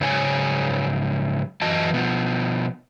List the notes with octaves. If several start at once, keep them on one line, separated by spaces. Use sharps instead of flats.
G#2 C#3 F#3 C#5 G#5
F#2 E3 F#4 D#5 A5
B2 D#3 F3